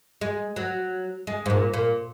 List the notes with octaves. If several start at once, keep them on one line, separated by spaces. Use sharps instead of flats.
G#3
F#3
G#3
G#2
A#2
A#2